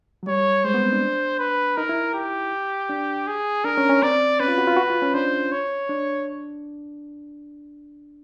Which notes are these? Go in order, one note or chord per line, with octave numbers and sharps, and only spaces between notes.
F#3
G3 C#5
G#3 C5
B3
C4
D4
B4
D#4 A#4
E4
G4
D4
G#4
D4 A#4
C#4
C#4
C4 D5
C#4 B4
F4
F#4
F4
F#4
F4
C#4
D4 C5
C#5
D4